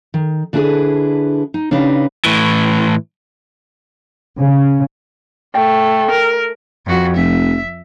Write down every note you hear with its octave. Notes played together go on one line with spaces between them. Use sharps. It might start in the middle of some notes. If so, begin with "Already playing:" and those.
D#3
D3 D4 E4 F4 G#4 B4
D#4
C#3 D4 D#4 G4 B4 F5
A2 E3
C#3
A3 G5
A#4
F2 F#4
F1 E5